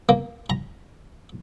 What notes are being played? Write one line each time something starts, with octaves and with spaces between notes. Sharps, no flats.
A#3
A#5